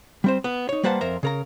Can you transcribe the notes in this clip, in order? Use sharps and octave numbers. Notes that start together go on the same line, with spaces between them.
G3 C4 C5
B3
D#4 C#5
G3 A#3 B4 C5 F#5 A5
F2 A#4 C5 E5 A#5
C#3 A#4 A#5